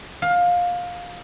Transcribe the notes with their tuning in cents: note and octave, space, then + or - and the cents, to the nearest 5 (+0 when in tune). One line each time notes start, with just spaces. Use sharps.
F5 +20